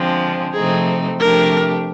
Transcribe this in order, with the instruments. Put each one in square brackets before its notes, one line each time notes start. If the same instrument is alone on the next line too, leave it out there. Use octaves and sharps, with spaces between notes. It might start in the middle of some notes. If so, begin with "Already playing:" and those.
Already playing: [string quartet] D3 F3 G#3 C4
[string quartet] C3 F3 A3 C4 D#4 [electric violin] G#4
[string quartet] C3 F3 A3 D4 G4 [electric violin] A#4